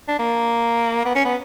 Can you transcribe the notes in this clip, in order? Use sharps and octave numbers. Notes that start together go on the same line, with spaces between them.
D4
A#3
B3
C#4
B3